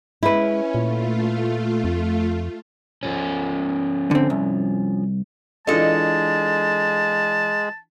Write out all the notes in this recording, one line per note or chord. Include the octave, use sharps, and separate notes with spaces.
G#3 C#4 E4 B4
A#2 A3 F4
F2
F3 C#4
D3 C4
C2
E3 G#3 D4 F4 A4 D#5 A5